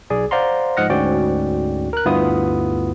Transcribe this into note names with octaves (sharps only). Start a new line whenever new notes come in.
B1 G#4 D5
C5 D5 F5 F#5 A#5 C6
G#2 F3 D#5 F#5 F6 A#6
D2 G#2 C#4 F#4 D5 G5
A#4 F#6
D2 G2 B3 E4 F4 D#6